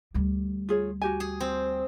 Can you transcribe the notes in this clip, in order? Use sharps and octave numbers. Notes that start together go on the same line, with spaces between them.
D2 G3
F4 G#4 C#5
F#4 G4 G#5
G#4
C4